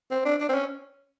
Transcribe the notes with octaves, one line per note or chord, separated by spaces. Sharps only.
C4
D4
D4
C4
C#4